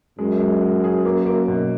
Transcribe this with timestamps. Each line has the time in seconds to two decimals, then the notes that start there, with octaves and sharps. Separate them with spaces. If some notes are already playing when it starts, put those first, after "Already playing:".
0.19 F#2 G#3
0.40 G#3
0.62 G#3
0.84 G#4
1.05 A#3
1.26 A#3
1.48 B2